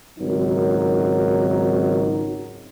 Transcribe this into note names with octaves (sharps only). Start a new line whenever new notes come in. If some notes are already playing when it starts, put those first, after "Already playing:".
G#1 C#2 F#3 D#4 A#4